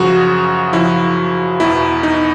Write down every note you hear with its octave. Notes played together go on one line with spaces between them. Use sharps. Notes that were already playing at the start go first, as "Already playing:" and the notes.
Already playing: F#2 C#3 F3 F#4
F#2 C#3 F3 E4
E2 B2 E4
D#4